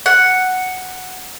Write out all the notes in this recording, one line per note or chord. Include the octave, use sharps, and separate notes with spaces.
F#5